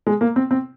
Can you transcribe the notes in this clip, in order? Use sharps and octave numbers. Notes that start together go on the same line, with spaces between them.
G#3
A#3
C4
C4